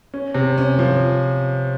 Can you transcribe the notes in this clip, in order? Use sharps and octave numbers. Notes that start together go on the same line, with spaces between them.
C#4
C3
C#4
F3